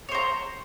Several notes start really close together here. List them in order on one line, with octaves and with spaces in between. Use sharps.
C#5 C5 A#5